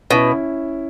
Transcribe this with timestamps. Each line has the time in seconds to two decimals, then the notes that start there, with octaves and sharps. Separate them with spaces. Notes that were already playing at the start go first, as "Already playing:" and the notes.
0.11 B2 C#4 E4